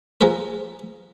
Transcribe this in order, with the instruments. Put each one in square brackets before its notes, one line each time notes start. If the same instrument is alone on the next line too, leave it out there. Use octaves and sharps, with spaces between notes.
[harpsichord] F3 G#4 A#4 B4